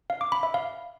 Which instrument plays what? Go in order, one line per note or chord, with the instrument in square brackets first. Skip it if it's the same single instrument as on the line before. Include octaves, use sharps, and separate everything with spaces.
[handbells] F5
D6
B5
E5
F5